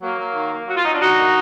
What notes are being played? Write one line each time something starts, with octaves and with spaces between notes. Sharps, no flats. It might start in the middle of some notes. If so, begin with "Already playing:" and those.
F#3 A#3
F#3
D#3
A#3
F#3 F#4
F4
F#3 D#4
D4 F4
D3 D#4 F#4
A#3